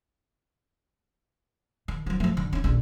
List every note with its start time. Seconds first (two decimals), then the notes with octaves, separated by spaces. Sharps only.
1.88 D#3
2.06 F3 F#3
2.20 F3 A3
2.37 D3
2.53 C#4 D#4
2.64 A#1 D3